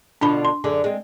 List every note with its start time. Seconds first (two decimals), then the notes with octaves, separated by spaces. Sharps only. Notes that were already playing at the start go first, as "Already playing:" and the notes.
0.21 B2 D3 F3 D4 B5
0.45 C6
0.64 F#2 D3 G#3
0.84 G#3 C4